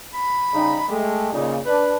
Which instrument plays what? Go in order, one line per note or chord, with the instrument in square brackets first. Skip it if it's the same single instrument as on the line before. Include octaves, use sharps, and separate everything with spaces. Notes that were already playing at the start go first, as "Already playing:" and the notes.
[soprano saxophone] B5
[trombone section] C#3 G3 D#4
[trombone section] G#3 A3 [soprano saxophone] G4
[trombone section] A#2 C#3 [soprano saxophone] D#4
[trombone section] D4 [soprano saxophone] B4